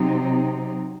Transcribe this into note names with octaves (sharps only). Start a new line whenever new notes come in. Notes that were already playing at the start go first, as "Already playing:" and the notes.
Already playing: C3 F#3 C4 D#4